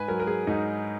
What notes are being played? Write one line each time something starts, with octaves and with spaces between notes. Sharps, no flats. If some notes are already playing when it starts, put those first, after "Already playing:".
Already playing: G#2 B4 G#5
F#3 A#4
A#4
G#4
G#2 D#4